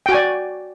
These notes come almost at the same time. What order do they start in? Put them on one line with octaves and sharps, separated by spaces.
G5 F#4 G#5 D5